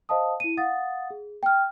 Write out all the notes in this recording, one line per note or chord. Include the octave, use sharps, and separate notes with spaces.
C5 D#5 F5 A5 D#6
E4 D#7
F5 F#5 D#6 A6
G#4
G5 F6